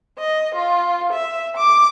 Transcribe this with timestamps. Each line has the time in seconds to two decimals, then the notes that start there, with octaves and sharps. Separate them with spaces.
0.18 D#5
0.55 F4
1.12 E5
1.57 D6